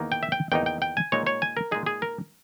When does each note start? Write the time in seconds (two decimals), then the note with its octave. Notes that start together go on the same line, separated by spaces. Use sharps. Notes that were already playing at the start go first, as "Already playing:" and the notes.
Already playing: E2 D#3 A#3 D#4
0.12 G5
0.23 E5
0.32 G5
0.52 E2 D#3 A#3 D#4 G5
0.66 G5
0.82 G5
0.97 G#5
1.12 A#2 G#3 D#4 C#5
1.27 C#5
1.42 G#5
1.57 A#4
1.71 A#2 G#3 D#4 G#4
1.86 G#4
2.02 A#4